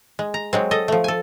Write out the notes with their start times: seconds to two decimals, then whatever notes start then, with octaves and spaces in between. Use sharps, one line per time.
0.19 G#3
0.34 A#5
0.53 F#3 G#3 C4
0.71 A4 D#5
0.88 F3 A3
1.04 A4 G#5